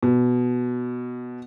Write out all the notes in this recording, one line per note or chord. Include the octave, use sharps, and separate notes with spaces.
B2